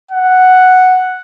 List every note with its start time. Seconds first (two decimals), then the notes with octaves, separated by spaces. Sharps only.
0.11 F#5